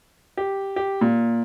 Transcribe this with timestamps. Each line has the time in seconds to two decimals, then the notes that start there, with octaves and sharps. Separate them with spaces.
0.37 G4
0.76 G4
1.01 A#2